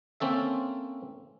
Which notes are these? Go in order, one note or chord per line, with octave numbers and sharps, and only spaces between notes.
A#3 C4 C#4 A4 E5